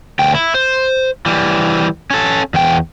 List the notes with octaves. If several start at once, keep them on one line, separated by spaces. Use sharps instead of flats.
D2 G5
E4
C5
E3 G3
C#4 A4
E2 G5